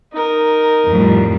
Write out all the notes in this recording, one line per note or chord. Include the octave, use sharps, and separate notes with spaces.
D#4 A#4
F2 A2 G3